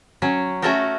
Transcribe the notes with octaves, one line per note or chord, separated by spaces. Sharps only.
F#3 C#4
A3 C#4 F#4 A4 A#4 G5